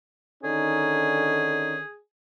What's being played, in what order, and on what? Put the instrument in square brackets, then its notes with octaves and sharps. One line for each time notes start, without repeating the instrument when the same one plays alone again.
[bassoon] D3 [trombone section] D#3 C#4 D#4 [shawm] G#4